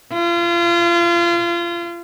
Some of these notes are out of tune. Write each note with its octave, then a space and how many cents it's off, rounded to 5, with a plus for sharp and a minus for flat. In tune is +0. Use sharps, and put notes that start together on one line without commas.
F4 -30